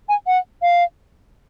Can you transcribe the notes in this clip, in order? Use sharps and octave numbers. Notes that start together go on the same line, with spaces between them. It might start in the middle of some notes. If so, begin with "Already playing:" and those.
G#5
F#5
F5